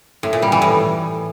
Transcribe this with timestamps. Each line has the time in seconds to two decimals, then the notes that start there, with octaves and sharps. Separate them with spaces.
0.23 A2
0.33 A#2
0.42 G3
0.52 E3
0.62 A2